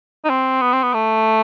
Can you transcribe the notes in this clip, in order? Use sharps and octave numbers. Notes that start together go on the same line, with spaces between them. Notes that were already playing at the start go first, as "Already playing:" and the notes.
D#4
C4
B3
C4
B3
A3